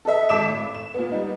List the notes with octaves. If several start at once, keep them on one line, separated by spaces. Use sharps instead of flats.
A4 B4 D#5 E5
G#1 A4 D6 B6 E7
A2
E7
A#2 B3
G3 B3 D#4